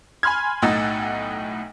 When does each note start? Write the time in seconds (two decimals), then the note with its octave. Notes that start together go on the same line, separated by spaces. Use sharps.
0.23 G#5 B5 C6 F6 G#6
0.62 B1 A2 D#4 F#5 E6 A6